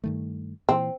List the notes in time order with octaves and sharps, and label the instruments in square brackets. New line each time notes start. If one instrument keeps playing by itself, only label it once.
[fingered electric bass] G2 D#3 A3
[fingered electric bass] A#2 E3 [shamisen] C4